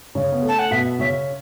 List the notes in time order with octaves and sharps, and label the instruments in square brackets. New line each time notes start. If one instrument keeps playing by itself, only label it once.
[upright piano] C#3 C#4
B3
A3
[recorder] A5
F#5
[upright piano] B2 B3 [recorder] E5
[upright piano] C#3 C#4 [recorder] E5